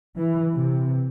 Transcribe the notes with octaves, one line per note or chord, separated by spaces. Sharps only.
E3
C3